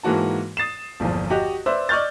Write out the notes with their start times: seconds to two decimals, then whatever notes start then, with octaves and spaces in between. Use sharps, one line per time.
0.03 G#2 E3 A#3 F#4 A5
0.57 D#6 A6 C7 E7
1.00 G1 E2 A#2 F3
1.30 F#4 G4 D#5
1.66 B4 C5 D5 E5 E6
1.89 D5 D#5 C#6 F6 G6 A6